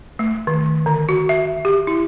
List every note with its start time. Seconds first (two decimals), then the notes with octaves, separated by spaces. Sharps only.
0.19 A3
0.47 D#3
0.86 D3
1.09 F#4
1.29 E5
1.65 G4
1.87 E4